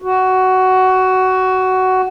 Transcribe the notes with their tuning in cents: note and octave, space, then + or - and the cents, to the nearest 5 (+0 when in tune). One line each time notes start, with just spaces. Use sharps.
F#4 +15